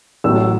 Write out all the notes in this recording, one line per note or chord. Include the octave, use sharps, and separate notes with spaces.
A1 A2 F#3 E6